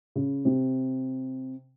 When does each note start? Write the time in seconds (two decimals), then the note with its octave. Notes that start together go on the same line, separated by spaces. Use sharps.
0.16 C#3
0.45 C3